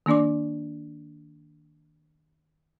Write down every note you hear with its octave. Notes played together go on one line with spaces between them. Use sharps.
D#3 A#3 D4 D5 D6